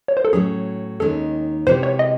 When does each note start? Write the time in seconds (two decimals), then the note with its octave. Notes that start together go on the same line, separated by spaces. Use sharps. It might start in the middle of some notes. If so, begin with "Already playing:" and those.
0.08 C#5
0.17 C5
0.25 A4
0.33 A2 F#3 C#4 G#4
1.00 D#2 D#3 G#3 C#4 A4
1.67 C3 E3 G#3 C#4 F#4 C5
1.83 C#5
1.99 D#5